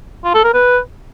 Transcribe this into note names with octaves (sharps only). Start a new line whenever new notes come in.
F4
A4
A#4
B4